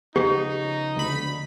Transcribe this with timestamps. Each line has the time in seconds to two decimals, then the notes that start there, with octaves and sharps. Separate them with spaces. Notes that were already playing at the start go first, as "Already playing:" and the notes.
0.16 C#3 F3 B3 D#4 G4
0.96 D2 B5